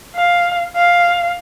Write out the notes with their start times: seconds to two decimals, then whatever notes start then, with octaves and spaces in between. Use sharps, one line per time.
0.15 F5
0.76 F5